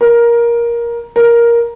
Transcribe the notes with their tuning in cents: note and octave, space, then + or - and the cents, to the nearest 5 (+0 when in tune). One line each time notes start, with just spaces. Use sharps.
A#4 +15
A#4 +10